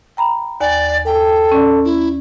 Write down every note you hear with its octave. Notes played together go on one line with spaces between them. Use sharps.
G5 A#5 B5
D#2 D5 G#5
A4 G5
C#4 D5
E4